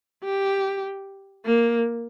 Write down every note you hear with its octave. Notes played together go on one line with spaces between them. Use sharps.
G4
A#3